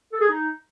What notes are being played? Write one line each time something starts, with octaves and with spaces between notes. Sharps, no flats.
A4
G#4
D#4